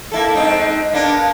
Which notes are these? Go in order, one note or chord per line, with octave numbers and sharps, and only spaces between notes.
A#3 E4 A4
G#2 C4 D#4
A#3 B3 D4